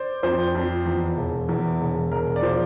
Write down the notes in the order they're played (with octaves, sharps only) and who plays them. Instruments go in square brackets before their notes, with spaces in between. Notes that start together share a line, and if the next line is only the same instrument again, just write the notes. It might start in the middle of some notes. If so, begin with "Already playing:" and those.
Already playing: [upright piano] C5 D5
[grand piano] F2 [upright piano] C5
[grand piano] F2
E2
E1
E2
E1
[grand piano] E1 [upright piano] A#4
[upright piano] D5
[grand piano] F3 [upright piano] C5